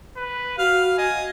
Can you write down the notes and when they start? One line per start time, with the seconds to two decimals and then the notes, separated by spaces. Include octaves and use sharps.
0.17 B4
0.59 F#4 F5 F6
0.98 D#5 G#5